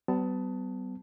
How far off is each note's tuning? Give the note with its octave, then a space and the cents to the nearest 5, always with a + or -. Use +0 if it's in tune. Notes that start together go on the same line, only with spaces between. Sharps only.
G3 -45 B3 +30 A5 +0